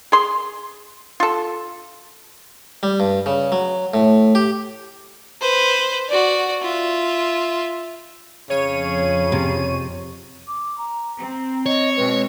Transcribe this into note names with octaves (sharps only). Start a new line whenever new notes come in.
G#4 C6
F4 A4
G3
G2
C#3
F#3
A2
G4
B4 C5
F#4 D5
F4 E5
F2 C#3 C#5 D#7
C3
D6
A#5
C4
C#5 D#5
B2 G#3 C4 B4